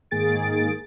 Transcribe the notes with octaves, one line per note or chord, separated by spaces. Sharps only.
G#2 D#3 A#3 G#4 A6 D7